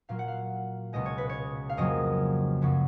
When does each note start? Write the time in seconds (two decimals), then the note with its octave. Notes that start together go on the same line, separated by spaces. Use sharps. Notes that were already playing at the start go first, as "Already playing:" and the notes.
0.09 A#2 F#3 A#3 F5
0.19 F#5
0.28 F5
0.93 C#2 B2 G#3 D#5
1.06 C#5
1.18 B4
1.29 C#5
1.69 F5
1.77 F2 C#3 F#3 A#3 D#5
2.62 F#2 C#3 F#3